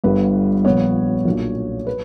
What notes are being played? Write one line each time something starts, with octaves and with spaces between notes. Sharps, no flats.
G1 G2 D3 G3 B3 B4
A#1 A#2 G3 B3 C#5
B1 A#2 A#3 D4
B4